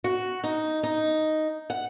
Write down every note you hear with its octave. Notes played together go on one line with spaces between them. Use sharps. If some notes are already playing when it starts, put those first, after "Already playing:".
F#4
D#4
D#4
F#5